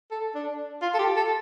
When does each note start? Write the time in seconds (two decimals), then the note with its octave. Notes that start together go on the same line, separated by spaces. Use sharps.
0.11 A4
0.35 D4
0.82 F4
0.94 A4
0.99 G4
1.17 A4